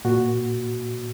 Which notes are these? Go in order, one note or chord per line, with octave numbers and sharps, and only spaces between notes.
A#2 F#4